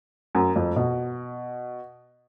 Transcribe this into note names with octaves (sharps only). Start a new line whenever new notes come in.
F#2
F2
B2